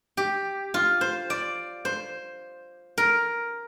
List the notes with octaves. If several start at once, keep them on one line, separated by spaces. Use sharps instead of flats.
G4
F4
C5
D5
C5
A#4